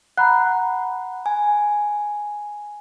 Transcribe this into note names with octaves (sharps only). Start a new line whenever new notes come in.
F#5 A#5 B5 F#6
G#5